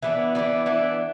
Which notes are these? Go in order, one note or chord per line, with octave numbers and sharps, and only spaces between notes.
E3 B3 D4
E3 B3 D4
E3 B3 D4